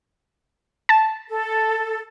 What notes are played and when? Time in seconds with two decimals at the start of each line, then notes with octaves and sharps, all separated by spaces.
0.89 A5
1.29 A4